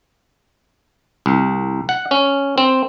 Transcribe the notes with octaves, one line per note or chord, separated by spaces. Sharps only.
C2
F#5
C#4
C4